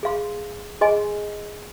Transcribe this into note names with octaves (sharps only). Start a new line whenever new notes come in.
G#4 F5 C6
G#4 D#5 G#5 C6